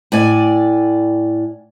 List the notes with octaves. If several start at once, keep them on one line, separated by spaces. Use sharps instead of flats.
A2 D5 G#5